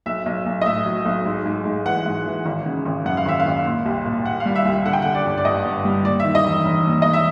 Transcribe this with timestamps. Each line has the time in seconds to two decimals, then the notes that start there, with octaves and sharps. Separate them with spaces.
0.06 B1 E5
0.26 B1
0.46 B1
0.61 D#5
0.65 A2 E5
0.86 F#3
1.05 B1
1.26 G#2
1.46 G#2
1.65 G#2
1.86 E3 F#5
2.06 G#2
2.26 E3
2.46 G#1
2.66 C#3
2.86 G#1
3.05 F#2 F#5
3.17 F5
3.26 G#1 E5
3.40 F5
3.46 G#1
3.66 A#2
3.86 C2
4.06 A#2
4.25 A#2 F#5
4.40 F5
4.45 G3
4.56 E5
4.65 C2
4.85 D3 F#5
4.93 G5
5.02 F#5
5.05 D3
5.15 D5
5.25 G1
5.38 D5
5.45 G2 D#5
5.65 G2
5.85 G3
6.05 D#2 D5
6.20 E5
6.25 D#3
6.35 D#5
6.45 E1
6.65 E1
6.85 D#2
7.02 E1 D#5
7.13 E5